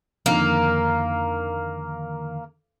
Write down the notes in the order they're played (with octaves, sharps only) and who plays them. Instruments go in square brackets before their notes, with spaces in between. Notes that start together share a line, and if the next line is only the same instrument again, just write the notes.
[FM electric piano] F2 D3 D#3 [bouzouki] A#3